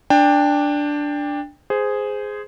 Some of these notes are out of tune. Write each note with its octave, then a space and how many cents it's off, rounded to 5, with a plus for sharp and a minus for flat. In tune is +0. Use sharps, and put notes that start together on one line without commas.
D4 +0 G5 +25
G#4 +0 C5 -15